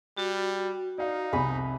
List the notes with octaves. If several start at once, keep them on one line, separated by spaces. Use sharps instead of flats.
G3 F#4
D#4 D5 F5
C2 F2 G#4 B5